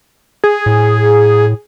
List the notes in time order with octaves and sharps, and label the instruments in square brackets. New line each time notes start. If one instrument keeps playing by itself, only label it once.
[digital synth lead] G#4
[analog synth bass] A2